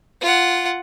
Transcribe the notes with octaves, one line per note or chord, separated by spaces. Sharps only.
F4 F#5